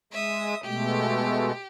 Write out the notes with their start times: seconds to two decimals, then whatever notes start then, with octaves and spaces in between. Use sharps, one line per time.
0.12 G#3 E5 D#6
0.64 B2 G#3 A3 G4